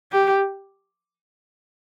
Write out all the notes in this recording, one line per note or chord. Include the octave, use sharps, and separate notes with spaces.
G4